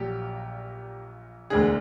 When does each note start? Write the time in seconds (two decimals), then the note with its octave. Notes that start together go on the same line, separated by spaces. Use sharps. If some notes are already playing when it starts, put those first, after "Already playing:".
Already playing: A#1 A#2 F#3 G4
1.50 E1 D2 D3 G#4